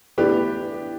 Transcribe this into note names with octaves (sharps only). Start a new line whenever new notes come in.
A2 E3 B3 D4 G4 B4